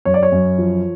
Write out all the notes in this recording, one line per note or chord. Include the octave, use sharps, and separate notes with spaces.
F#2 C#5
D5
C#5
F#2
F3